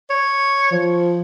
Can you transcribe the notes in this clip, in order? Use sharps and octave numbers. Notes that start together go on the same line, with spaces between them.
C#5
F3